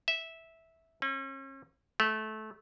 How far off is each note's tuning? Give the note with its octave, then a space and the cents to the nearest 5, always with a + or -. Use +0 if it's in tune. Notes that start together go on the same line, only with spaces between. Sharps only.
E5 -10
C#4 -40
A3 -20